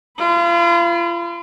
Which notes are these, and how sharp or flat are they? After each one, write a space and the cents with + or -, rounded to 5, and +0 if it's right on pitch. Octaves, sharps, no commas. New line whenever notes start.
F4 -35 B5 +0